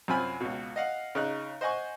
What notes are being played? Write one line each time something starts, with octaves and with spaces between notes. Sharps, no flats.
F#2 C3 C4 F4 G#5 B5
C#2 B2
D#5 F5 F#5
C#3 D#4 F#6
C5 D#5 F#5 G#5 C#6